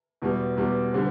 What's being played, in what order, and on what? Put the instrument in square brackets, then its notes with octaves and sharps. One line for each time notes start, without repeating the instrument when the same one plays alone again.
[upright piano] E2 B2 G3
E2 B2 G3
D3 G3 C4